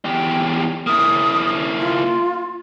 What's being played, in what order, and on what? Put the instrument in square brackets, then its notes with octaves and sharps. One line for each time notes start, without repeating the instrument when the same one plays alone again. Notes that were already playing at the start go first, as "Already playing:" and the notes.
[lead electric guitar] E2 G4
[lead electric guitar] A#3 E4 [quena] D#6
[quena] F4